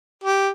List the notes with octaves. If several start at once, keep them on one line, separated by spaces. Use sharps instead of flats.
G4